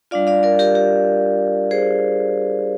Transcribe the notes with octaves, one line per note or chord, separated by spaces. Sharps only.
G3 D4 F4 D5 F5
D5 F5
A#4 D5
G4 A#4
G4
G#4 C5